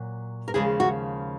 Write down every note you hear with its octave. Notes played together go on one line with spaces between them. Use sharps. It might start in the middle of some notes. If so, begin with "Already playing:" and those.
Already playing: A#2 F#3
A#4
D#2 C#3 F3 G#3 G#4
F#4